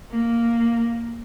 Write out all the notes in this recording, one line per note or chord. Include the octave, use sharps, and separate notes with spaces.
A#3